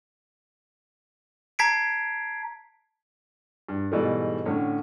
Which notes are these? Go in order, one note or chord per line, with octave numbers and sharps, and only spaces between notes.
A5 A#5 G#6 B6 C7 D7
G2
G#2 B2 E3 G3 A3
A2 D3 C#4